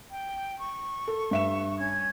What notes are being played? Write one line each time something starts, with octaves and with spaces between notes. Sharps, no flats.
G5
C#6
A4
G2 E5 E7
C#4 G#6